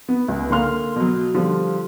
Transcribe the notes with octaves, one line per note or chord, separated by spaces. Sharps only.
B3
C#2
D3 A#3 F5 C6 F6
B2 F#3
D3 F3 G3